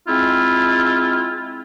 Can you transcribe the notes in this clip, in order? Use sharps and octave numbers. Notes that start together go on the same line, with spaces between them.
G#3 C4 E4 F4